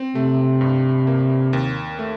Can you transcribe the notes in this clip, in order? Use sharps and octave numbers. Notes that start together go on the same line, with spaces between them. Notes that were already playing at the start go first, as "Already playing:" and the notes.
Already playing: C4
C3 A3
G2
A#3
D#2
A3